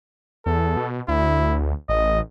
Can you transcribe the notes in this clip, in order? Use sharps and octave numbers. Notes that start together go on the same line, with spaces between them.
E2 A4
B2
D2 E4
A1 D#5